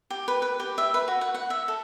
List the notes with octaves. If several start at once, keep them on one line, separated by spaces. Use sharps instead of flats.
G4
B4
B4
G4
E5
B4
F#4
F#5
F#5
E5
A4